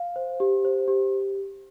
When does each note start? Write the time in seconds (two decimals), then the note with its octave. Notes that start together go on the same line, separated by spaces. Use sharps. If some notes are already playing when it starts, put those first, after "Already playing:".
Already playing: F5
0.16 C5
0.40 G4
0.65 C5
0.88 G4